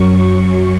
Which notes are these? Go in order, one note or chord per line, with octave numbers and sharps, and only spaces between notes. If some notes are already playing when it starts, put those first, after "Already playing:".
Already playing: F#2 F#3 C#6